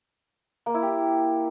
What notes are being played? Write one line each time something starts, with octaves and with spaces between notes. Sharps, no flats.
A#3
E4
G4